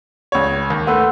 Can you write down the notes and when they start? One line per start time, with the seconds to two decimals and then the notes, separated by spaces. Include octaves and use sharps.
0.32 C#2 C#5
0.70 D#2
0.87 A3 B4 F#5 C6 E6